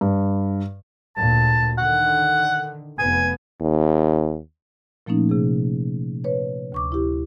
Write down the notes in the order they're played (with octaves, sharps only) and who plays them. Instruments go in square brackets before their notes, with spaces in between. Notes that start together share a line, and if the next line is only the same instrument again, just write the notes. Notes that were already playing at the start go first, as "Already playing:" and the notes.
[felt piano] G2
[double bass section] D2 A#2 [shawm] A5
[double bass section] D3 D#3 [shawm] F#5
[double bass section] F1 B3 [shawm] G#5
[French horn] D#2
[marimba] A#2 F3 A3 A#3 C#4 D#4
C3 G#4
B4 C#5
D2 C#6 D6
E4 G4